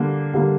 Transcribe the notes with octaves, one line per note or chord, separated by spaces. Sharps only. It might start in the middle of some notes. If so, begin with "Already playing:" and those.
Already playing: D3 G3 A#3
D3 G3 A#3